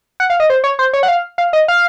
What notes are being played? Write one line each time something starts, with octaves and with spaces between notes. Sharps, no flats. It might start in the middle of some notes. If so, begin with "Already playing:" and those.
F#5
F5
D#5
C5
C#5
C5
C#5
F#5
F5
F5
D#5
F5